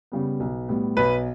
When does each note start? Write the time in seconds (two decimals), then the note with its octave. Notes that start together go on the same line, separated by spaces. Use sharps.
0.12 C#3 G3 B3
0.40 B1
0.69 A2 G3 B3
0.97 B1 B4